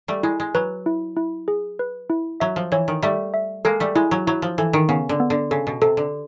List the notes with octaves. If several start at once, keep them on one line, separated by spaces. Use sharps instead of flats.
G3 A3
G#3 E4
G#3
F#3 B4
E4
E4
G#4
B4
E4
F#3 E5
F3
E3 C#5
D#3
G3 A3 E5
E5
G#3 A#3 A4
G3 A3
G#3 E4
F#3
F#3 E4
F3
E3 A4
D#3
C#3 B3
D3
B3
D3
C#3 A4
B2
C3 A4
D3